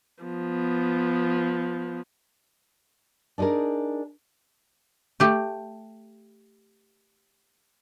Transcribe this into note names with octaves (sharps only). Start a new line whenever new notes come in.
F3 B3
D4 D#4 F#4 G#4 A#4
A3 G4